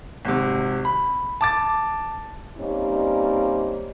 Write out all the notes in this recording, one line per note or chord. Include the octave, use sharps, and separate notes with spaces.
G#1 C3
B5
A5 D6 A6
G3 A#3 C4 C#4 D#4 D5